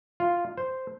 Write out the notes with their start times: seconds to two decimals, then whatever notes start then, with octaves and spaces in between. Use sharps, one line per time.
0.20 F4
0.57 C5